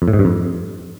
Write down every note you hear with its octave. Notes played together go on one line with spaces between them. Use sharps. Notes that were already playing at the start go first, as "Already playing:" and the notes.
F2
A2
G#2
G2
F2